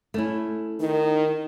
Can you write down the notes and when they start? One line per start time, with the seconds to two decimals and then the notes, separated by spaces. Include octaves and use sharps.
0.14 A3 C#4 E4
0.80 D#3 D#4